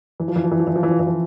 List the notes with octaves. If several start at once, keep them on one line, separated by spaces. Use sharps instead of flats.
E3
F3
E3
F3
E3
F3
E3
F3
E3
F3
E3
F3